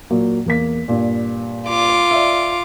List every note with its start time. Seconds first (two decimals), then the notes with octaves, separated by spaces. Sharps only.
0.10 A#2 F#3 A#3
0.46 E2 A#3 B6
0.88 G2 A#2
1.69 F4 D6
2.11 D5 E5